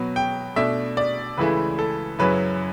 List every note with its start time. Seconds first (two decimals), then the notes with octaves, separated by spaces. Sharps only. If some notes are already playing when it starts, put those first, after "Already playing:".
Already playing: B2 F#3 B3
0.16 G5
0.56 B2 A3 D4 E5
0.97 D5
1.37 C#2 C#3 E3 A3 E4 B4
1.79 A4
2.19 F#2 C#3 F#3 C#4 E4 B4